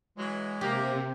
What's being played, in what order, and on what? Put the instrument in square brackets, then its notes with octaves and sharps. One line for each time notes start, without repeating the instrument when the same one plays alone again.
[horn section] E3 F#3 [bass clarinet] G#3
[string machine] C3 [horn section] A#3 [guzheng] G4